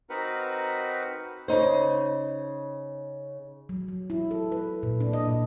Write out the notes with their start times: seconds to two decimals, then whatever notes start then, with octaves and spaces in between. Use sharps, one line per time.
0.10 C4 D#4 F#4 A#4 B4 F#5
1.48 C#3 D#4 C5
3.69 F#3
3.88 F#3
4.10 E4
4.31 A4
4.52 B4
4.83 A#2
5.00 D4
5.13 D#5
5.28 A#2